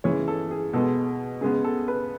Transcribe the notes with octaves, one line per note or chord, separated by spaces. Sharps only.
C#3 E3 G#3 C#5
A4
G#4
B2 G#3 B3 A4
C#3 G#3 B3 G#4
A4
B4